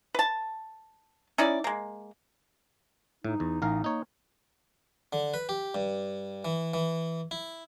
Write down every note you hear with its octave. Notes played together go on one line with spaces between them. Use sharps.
B4 A5
C#4 D#4 E4 D5
G#3 A#3
A2 D#4
E2
A1 D#4 A#4 F5
A#3 D#4 C#5
D3
B4
G4
G2
E3
E3
E4